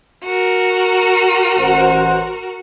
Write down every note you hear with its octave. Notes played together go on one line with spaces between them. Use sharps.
F#4 A#4
A1 C5 F#5